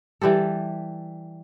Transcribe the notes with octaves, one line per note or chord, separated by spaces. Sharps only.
E3 G3 G4 A4